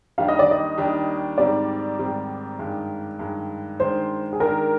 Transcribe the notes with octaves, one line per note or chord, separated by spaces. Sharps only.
D#2 D#3 G3 D4 F5
D#5
D5
D#5
D#2 D#3 G3 D4
G#2 D#3 G3 C4 D5
G#2 D#3 G3 C4
G2 D#3 G#3
G2 D#3 G#3
D#3 G#3 D4 C5
G#4
D#3 G#3 D4 A#4